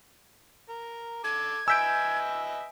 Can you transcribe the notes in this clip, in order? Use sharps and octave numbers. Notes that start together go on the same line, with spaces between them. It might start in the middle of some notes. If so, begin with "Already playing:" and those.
A#4
A4 D6 G#6
B4 D#5 E5 G#5 E6 G6 B6 D7